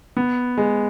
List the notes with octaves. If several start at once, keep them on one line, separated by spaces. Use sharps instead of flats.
B3
G#3